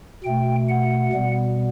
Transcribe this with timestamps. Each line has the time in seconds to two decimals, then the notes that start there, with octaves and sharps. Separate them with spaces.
0.24 B2 A3 G5
0.69 F#5
1.13 B2 G3 B3